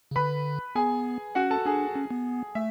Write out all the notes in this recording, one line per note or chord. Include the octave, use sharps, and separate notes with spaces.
C#3
D3 B4 B5
B3 G#4 G#5
C#4 F#4 F#5
A4 A5
D4 G#4 G#5
C#4
B3
A3 E5